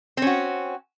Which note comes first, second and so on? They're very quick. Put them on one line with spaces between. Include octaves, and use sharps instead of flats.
C4 C#4 F#4